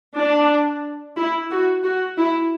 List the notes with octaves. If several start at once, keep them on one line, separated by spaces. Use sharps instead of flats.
D4
E4
F#4
F#4
E4